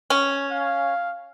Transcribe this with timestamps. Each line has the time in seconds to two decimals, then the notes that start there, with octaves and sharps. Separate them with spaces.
0.10 C#4
0.52 F5